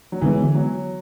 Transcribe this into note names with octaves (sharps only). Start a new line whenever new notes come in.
F#3
D3 E3 G#3 B3
F#3